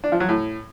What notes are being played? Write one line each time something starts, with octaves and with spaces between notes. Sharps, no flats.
D4
F3
F#3
A2